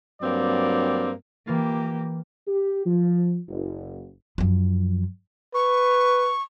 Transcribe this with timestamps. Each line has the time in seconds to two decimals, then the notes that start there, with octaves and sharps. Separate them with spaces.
0.21 G2 F#3 A#3 C4 D5
1.47 E3 A#3 F4 G4
2.47 G4
2.86 F3
3.48 F#1
4.38 F#2 F3
5.54 B4 C#6